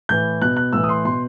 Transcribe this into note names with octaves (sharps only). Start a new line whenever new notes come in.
A2 E3 G6
B2 F#6
F#6
A2 E3 E6
D#6
C6
B2 C6